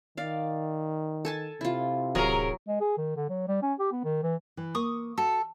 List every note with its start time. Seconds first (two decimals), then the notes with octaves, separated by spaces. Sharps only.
0.17 D#3 D5 F5
1.25 A4 G#5 A5
1.61 C3 E4 F4
2.15 D1 F#3 G#4 A#4 C#5
2.68 G#3
2.81 G#4
2.98 D#3
3.16 D3
3.29 F#3
3.48 G3
3.62 C#4
3.79 G4
3.92 B3
4.05 D#3
4.23 E3
4.57 E3
4.75 A#3 C#6 D#6
5.18 F#4 A4